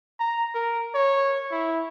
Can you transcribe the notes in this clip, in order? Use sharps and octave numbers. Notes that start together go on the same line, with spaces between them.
A#5
A#4
C#5
E4